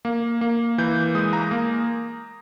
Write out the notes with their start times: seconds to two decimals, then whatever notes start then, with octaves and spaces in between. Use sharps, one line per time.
0.05 A#3
0.41 A#3
0.78 E3 G6
1.15 G#3 D#6
1.33 A#5
1.51 A#3